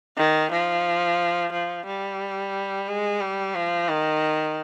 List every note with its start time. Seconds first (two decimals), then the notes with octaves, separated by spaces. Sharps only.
0.17 D#3
0.51 F3
1.52 F3
1.86 G3
2.88 G#3
3.20 G3
3.55 F3
3.88 D#3